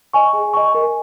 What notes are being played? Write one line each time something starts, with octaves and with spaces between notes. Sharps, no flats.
D#5 G#5 C#6
G#4
D#5 G#5 C#6
A#4